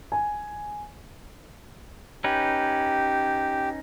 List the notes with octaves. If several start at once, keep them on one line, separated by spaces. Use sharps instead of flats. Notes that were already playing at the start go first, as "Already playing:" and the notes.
G#5
C#4 D#4 G4 B4